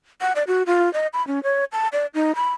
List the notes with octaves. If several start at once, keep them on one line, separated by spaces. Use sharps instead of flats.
F#5
D5
F#4
F4
D#5
B5
C#4
C#5
A5
D5
D#4
B5